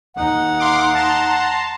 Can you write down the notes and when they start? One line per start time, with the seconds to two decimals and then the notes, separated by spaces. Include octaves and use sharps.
0.16 D#2 D#4 F#5
0.60 F5 C6 D6
0.95 A5 A#5 C6